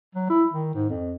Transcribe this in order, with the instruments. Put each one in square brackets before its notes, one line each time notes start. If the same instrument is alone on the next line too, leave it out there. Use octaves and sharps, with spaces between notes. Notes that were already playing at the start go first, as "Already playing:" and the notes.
[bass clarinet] F#3
E4
D#3
G#2
F2